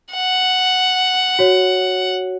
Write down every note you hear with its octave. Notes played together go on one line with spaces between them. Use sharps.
F#5
F#4 C#5